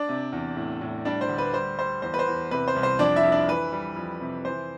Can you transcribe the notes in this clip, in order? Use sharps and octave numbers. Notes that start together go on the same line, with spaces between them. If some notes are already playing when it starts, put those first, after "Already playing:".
Already playing: D4 D5
C3
E2
A2
A2
G3 D4 D5
C5
D2
B4
G3 C5
G3 C5
E2 C5
B4
C5
E2
C3 B4
C5
C2
C5
F2 D4 D5
E4 E5
F2
D4 D5
E3 B4
G3
F2
C3
E3 C5